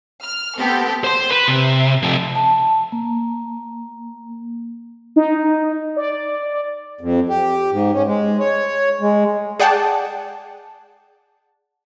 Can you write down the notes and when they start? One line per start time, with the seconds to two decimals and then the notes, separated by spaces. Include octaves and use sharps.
0.23 F6
0.57 B3 C4 G4 A4
1.04 C5 C6
1.31 B4 B5
1.48 C3
2.03 C3 F3
2.35 A5
2.92 A#3
5.16 D#4
5.96 D5
7.01 F2
7.29 G4
7.72 G#2
7.94 C#4
8.06 G#3
8.40 C#5
9.01 G#3
9.60 G#4 D5 F#5 G5 A5